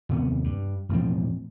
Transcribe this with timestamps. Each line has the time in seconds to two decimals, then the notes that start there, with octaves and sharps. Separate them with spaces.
0.09 D#2 C3 A#3 B3
0.44 G2
0.89 E1 A2 F3 C4